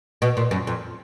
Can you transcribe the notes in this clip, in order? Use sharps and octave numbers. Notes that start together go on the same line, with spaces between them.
B2
A#2
F#2
F2